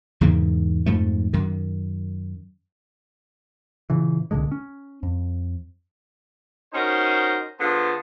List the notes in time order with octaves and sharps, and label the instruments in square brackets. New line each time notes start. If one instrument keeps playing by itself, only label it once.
[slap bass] E2 G#2 C#3 A#3
F2 G#2 F3 A3
F#2 D#3
[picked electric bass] A#2 C#3 E3
C2 A#2 D3 G#3
C#4
F2
[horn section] C#4 D#4 F#4 A#4 C5
D3 B3 F4 G#4 C5 A5